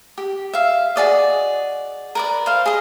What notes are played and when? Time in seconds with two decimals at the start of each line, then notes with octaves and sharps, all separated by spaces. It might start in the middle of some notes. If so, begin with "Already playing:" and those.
0.18 G4
0.53 E5 F5
0.96 F#4 G#4 D5 D#5
2.15 A#4 B4 D5
2.46 C5 F5
2.66 G#4 D#5